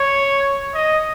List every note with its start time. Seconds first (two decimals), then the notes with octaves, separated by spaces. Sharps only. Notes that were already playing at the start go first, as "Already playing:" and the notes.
Already playing: C#5
0.74 D#5